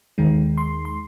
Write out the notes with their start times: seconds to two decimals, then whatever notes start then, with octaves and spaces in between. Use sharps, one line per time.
0.18 D#2 D#3 G#3
0.58 C6
0.85 C6